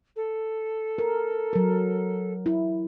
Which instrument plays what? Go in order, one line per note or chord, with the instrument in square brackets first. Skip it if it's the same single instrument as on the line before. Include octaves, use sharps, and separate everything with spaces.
[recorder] A4
[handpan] A#4
F#3 A#4
E4